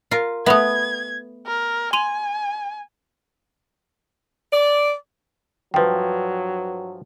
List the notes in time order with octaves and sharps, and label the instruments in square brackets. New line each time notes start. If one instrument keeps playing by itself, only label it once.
[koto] F4 A#4
[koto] A3 B3 [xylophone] E5 B5 D#6 [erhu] G#6
[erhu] A#4
[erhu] G#5 [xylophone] C6 D#7 F7
[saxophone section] D5
[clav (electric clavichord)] G2 F3 [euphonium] F#3 [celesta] B4 G5